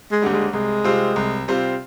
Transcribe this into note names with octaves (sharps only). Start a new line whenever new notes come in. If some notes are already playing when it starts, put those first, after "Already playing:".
G#3
D#2 D3 G3
G#3
C2 G#3
C3 G3 C4 F4
C2
C3 G3 C4 F4